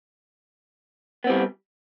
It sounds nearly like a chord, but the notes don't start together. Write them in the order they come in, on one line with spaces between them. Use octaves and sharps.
B3 C4 G3